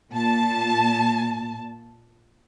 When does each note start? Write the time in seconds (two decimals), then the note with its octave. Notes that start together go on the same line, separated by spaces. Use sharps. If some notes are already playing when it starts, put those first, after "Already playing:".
0.12 A#2 A5